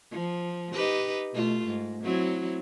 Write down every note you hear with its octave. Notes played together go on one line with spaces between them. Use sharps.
F3
D#4 G4 B4
B2 A3 F4
G#2
F#3 C4 E4